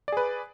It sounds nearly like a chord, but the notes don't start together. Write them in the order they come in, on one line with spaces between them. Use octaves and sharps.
D5 G#4 B4